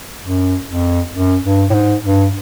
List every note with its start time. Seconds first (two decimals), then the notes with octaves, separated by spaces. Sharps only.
0.23 F#2
0.68 F2
1.15 F#2
1.44 G2
1.70 A2
1.74 G#2
2.05 G2